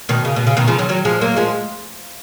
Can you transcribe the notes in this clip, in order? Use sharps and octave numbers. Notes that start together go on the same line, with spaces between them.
B2 D#3
C#3
B2
C#3
B2 D#3
C#3 F3
D#3 F#3
D#3 F#3
F3 G#3
F#3 A#3
F3 G#3